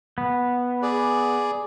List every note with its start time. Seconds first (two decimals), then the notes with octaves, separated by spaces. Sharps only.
0.18 B3
0.82 G#4 D5